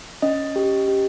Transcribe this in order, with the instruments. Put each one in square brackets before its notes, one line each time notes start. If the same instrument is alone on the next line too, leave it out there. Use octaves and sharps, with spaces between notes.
[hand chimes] C#4 D#5
G4
G4